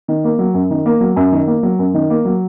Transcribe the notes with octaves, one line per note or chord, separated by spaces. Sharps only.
D#3
A#3
F#3
F#2
D#3
A#3
F#3
F#2
D#3
A#3
F#3
F#2
D#3
A#3
F#3